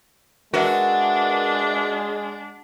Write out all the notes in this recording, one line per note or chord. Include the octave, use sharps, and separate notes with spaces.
G#3 D4 F#4 A#4 B4 E5